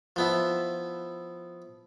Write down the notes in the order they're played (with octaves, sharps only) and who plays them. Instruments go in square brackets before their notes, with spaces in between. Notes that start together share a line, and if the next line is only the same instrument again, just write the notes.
[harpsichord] F3 B3 E4